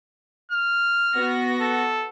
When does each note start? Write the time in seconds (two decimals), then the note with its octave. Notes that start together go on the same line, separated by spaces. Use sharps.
0.52 F6
1.15 B3 F#4 A#6
1.61 A4